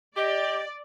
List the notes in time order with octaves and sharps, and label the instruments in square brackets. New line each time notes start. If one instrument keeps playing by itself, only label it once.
[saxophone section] G4 [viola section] D5 [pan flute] D#5